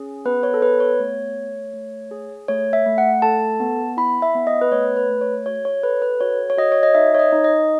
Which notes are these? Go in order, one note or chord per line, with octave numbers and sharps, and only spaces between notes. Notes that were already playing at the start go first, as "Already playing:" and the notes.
Already playing: C#4 G#4
B3 B4
C#5
A4
B3 B4
C#5
A3
A3
A3
G#4
A3 C#5
E5
A3
F#5
A4 A5
B3
E4 B5
E5
B3
D#5
B4
A3 C#5
B4
A3
C#5
F#4 C#5
C#5
A4 B4
B4
F#4 C#5
C#5
F#4 D#5
C#5
D#5
D#4 E5
C#5
D#5
D#4
D#5